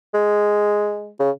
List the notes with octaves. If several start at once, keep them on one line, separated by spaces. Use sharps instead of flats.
G#3
C#3